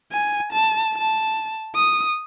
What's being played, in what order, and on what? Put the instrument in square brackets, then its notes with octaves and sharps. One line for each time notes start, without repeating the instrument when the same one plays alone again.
[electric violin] G#5
A5
A5
D#6